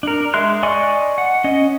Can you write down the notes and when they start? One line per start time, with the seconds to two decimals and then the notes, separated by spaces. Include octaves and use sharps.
0.03 D4 A#4
0.34 G#3 E5 C6 F#6
0.63 D5 D#5 G#5 C#6
1.18 F#5
1.44 C#4 D#5